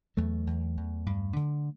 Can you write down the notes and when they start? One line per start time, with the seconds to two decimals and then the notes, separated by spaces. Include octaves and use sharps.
0.17 E2 F#3 A3
0.47 E2
0.77 E2
1.06 G2
1.36 D3